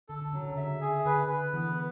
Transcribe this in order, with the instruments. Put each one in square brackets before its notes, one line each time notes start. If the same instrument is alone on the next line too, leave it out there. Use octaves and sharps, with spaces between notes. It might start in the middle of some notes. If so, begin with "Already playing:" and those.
[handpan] D3 [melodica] A4
[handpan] D3
[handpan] C#3 [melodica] F#3
[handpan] C#3
[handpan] D3 [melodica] E5
[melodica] G#4
[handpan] D3 [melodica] B4
[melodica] B4
[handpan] E3 [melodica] B3